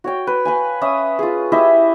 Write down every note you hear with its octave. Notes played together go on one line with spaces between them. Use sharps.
F#4 C#5 G5
B4
B4 F5 G#5
C#4 E5 D#6
F4 G#4
E4 G4 D#5 E5